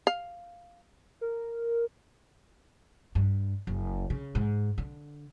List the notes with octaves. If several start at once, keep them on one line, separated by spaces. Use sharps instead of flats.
F5
A#4
G2
F#1
C#3
G#2
D3